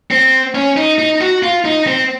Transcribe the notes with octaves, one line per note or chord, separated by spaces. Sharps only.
C4
C#4
D#4
D#4
F#4
F4
D#4
C4